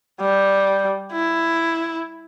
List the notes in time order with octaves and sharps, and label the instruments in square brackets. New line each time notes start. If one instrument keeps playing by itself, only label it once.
[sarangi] G3
E4